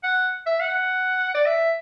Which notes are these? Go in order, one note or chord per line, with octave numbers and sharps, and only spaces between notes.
F#5
E5
F#5
D5
E5